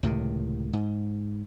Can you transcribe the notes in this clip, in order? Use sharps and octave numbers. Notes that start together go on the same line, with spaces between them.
C#2 A2 C3 D#3
G#2